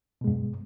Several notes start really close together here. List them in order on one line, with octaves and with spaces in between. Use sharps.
B2 G#3 G2